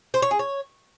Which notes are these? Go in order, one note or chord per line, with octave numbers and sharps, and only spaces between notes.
C5
C#5
G#4
C#5